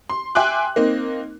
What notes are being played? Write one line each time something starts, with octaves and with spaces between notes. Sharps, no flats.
C6
E5 G5 G#5 C6 D6 F#6
A#3 C4 D#4